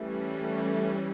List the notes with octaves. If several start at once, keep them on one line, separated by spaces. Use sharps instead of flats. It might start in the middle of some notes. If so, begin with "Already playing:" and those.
Already playing: E3 G3 A3 C#4
A3